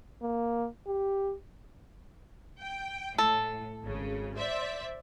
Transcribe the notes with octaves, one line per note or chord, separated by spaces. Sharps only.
A#3
G4
G5
A2 A4
G#1 C#3
C5 D5 E5